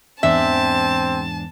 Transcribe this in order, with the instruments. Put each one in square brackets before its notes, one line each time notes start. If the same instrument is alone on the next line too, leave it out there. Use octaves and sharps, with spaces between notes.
[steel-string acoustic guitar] E2 G#2 D4 [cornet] C4 [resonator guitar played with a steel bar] E5 [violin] A5